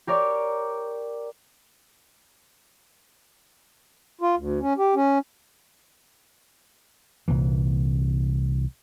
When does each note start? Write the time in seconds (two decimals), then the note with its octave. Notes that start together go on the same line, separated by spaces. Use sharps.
0.07 G4 A#4 C#5 D5
4.21 F4
4.37 D2
4.60 C#4
4.78 G4
4.95 C#4
7.28 C2 A#2 E3